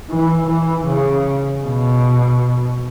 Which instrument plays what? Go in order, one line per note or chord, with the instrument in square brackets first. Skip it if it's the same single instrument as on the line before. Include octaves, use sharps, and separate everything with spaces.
[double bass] E3
E3
C#3
B2